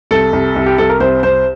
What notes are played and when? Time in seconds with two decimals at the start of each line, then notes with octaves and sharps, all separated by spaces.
0.11 C2 A4
0.33 C2
0.56 C2
0.66 G4
0.78 C2 A4
0.89 A#4
1.00 C2 C5
1.23 C2 C5